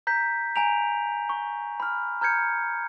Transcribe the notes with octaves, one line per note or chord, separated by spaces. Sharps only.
A#5 G6 B6
G#5 A#5 D7 F7
C#6
B5 F6
A#5 F6 G6 G#6 C#7